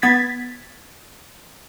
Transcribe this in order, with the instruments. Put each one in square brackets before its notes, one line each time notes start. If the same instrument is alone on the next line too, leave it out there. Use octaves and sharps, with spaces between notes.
[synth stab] B3 G#6 A6 B6